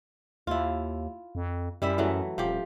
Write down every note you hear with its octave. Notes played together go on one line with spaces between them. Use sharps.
D#2 E4 F4
F2
F#2 G3 E4 E5
E3 F#3 A3
D#1 F3 G4